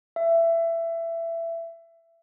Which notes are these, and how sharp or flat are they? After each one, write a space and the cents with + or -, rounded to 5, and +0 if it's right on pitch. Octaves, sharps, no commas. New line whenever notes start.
E5 +20